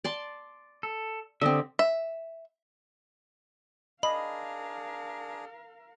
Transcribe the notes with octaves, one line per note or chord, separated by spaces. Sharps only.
D5 A5 C6
A4
D3 C4 G4 D#5 E5
E5
D4 G#4 A#4 D#5 F5 B5